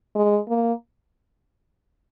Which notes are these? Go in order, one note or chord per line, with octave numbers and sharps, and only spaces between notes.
G#3
A#3